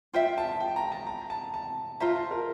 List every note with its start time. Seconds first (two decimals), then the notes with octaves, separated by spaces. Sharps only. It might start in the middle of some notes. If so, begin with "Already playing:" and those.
0.13 F4 C5 E5 G5
0.38 A5
0.60 G5
0.76 A#5
0.92 A5
1.07 A#5
1.30 A5
1.54 A5
2.00 F4 C5 E5 A#5
2.16 A5
2.31 A#4